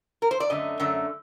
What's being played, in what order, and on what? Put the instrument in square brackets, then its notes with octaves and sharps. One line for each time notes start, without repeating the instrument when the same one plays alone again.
[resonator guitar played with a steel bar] A#4
C5
D5
F#2 D3 A3 D#5
F#2 D3 A3